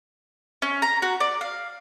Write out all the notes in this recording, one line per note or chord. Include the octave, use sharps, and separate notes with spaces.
C#4
A#5
F#4
D5
F5